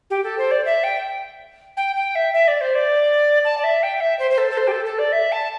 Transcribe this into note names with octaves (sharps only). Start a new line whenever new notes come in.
G4
A4
C5
D5
E5
G5
G5
G5
E5
E5
D5
C5
D5
A5
D5
E5
G5
E5
C5
C5
A4
A4
C5
G4
A4
A4
D5
E5
A5